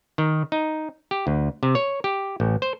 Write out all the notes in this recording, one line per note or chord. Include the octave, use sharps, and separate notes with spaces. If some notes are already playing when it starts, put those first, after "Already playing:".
D#3
D#4
G4
D2
C3
C#5
G4
A1
C5